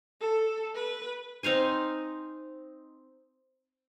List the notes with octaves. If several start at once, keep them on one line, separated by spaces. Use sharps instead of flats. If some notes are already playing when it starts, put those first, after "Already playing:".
A4
B4
C4 D#4 F5 G#5